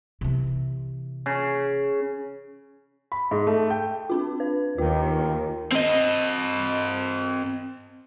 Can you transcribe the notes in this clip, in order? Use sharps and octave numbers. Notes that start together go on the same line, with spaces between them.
C3 E3
C#3
B5
G#2
A3
G5
C4 D4 F4
B4
D#2 D#3 F4
C4 D#5